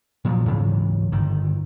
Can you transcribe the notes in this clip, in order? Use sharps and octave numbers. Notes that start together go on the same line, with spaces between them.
A#2 F3 F#3
G#2 C#3 E3 F#3
G1 D#3